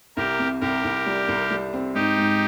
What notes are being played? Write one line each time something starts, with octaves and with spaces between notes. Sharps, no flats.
C2 G4 A#4
C3
C2 G4 A#4
C2
G3
C2
G3
C4
G#2 D#4 G4
G#2